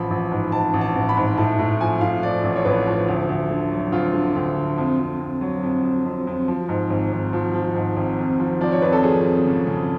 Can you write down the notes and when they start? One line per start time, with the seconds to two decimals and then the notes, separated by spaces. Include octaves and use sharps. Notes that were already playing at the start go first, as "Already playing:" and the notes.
Already playing: A1 F3 B5
0.10 A1
0.31 G#2
0.52 G#2 A5
0.74 A1
0.81 A5
0.95 A1
1.09 B5
1.17 G#2
1.38 A2 A5
1.59 A2
1.81 F3 G#5
2.01 A2 F5
2.23 F3 D5
2.44 A1
2.56 C#5
2.65 A1 B4
2.87 F3
3.08 D2
3.29 D2
3.50 D3
3.72 F#3
3.92 D2 F4
4.14 D3
4.36 D2
4.57 D3
4.78 F2
5.00 F2
5.20 F2
5.41 F#3
5.63 F2
5.84 F2
6.05 F2
6.27 F2
6.48 F3
6.69 G#2
6.90 G#1
7.12 G#1
7.33 F3
7.54 F3
7.76 G#2
7.97 G#1
8.19 F2
8.39 F3
8.61 F3 D5
8.72 C#5
8.82 F2 B4
8.93 A4
9.03 F3 G#4
9.24 F2
9.46 C#3
9.67 C#3